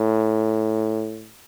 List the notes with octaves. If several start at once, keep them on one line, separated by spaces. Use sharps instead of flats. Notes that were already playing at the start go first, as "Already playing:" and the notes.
Already playing: A2